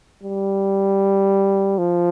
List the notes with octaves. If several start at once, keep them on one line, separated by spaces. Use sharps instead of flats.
G3
F3